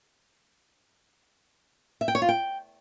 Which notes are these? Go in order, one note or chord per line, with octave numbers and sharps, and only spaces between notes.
E5
G5
C#5
F4
G5